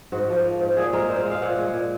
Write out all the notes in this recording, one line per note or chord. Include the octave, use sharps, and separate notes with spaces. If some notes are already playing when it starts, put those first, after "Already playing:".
G#2 F#4
F3
A#3
G#2
A#2 G#4
G#3 A#4
A#2 C5
F5
G#3
F5
A#2 F#5
G#3
A#2